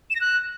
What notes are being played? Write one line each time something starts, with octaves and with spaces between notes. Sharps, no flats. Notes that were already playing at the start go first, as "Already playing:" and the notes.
E7
A#6
F#6